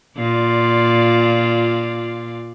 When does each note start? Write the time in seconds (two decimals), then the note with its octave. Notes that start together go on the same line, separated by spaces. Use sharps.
0.17 A#2 F4 D5